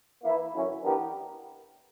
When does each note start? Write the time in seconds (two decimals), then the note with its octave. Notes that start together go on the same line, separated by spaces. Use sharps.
0.22 E3 A#3 E4 B4
0.53 F#2 D3 F#3 C#4 E4
0.83 E3 B3 D4 G4 A#4